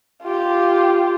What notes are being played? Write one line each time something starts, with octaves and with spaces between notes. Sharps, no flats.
F4 G4